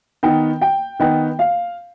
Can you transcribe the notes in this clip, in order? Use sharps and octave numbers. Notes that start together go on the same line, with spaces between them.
D#3 B3 D#4 G5
G5
D#3 B3 D#4 G5
F5